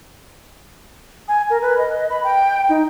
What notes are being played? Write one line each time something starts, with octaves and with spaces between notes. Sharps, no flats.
G#5
A#4
B4
D#5
B5
G5
D#4